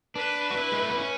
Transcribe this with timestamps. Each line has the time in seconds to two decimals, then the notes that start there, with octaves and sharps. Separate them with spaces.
0.15 D4 B4
0.51 F#4
0.57 E4
0.72 G#3
0.82 A3
0.90 B3
0.98 C#4